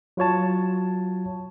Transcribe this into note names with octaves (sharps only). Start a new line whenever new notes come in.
F#3 F4 C#5 A5